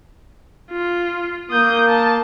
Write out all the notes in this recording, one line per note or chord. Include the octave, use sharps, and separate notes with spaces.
F4
A#3 D#6 G6
A5